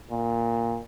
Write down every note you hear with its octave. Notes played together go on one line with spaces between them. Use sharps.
A#2